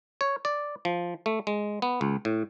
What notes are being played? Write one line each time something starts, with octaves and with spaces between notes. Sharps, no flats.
C#5
D5
F3
A3
G#3
B3
C#2
A2